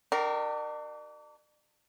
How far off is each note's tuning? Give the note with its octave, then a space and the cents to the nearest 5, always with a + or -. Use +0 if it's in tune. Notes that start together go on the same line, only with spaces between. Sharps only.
D4 +40 G4 -40 A#4 +0